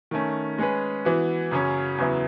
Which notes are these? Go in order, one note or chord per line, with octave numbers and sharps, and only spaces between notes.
D#3 A3 C#4
G#3 C#4 G#4 B4
E3 B3 F#4
F#2 C#3 F#3 C#4
E2 C#3 F#3 B3 E4